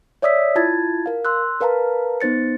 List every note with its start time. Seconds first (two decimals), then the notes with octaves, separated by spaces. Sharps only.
0.22 C#5 D5 E5 D#6 E6 B6
0.55 E4 F4 A5 G#6 A6
1.06 A#4 F5
1.25 C6 E6 F#6
1.60 A#4 B4 F5 A5 A#5
2.21 B3 D#4 C5 A6 C#7